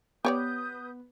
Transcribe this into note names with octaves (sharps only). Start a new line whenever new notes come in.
B3 G4 B4 C#5 D5 D#6 G6